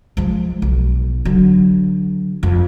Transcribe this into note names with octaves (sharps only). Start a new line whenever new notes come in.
F3 G#3
B1
D3 F#3
F2